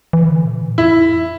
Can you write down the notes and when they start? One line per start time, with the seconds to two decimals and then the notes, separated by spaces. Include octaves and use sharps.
0.13 E3
0.29 D3
0.45 A#2
0.61 A2
0.78 F2 E4